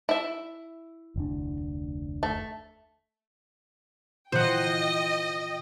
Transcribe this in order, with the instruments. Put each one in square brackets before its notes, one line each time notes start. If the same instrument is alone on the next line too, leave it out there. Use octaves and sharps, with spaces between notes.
[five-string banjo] E4 E5
[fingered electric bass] F1 D2 D4
[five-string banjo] A3
[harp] A#2 E3 [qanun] C5 F#5 [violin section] D#5 G5